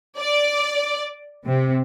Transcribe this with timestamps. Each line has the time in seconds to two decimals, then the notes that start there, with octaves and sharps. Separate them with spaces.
0.18 D5
1.46 C3